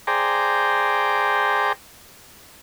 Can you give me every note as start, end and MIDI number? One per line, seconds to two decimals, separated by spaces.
0.07 1.72 68
0.07 1.72 72
0.07 1.72 74
0.07 1.72 79
0.07 1.72 82